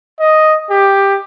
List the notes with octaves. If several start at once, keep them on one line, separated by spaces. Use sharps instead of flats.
D#5
G4